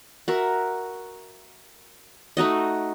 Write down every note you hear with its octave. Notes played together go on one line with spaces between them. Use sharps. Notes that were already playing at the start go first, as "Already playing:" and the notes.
F#4 A#4 E5
A3 D#4 F#4 D#5